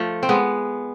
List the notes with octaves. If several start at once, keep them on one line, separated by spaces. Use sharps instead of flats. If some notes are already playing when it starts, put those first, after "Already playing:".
Already playing: F3 A3
C4
G#3 B3